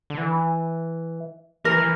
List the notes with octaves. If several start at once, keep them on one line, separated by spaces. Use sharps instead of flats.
D3
E3
E3 A#4
E3